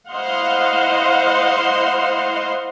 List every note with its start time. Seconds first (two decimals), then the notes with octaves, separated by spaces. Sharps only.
0.10 E4 C5 D#5 F5 F#5 C6